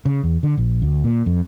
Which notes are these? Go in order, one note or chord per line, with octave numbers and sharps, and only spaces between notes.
C#3
E2
D3
A#1
D2
A#2
F2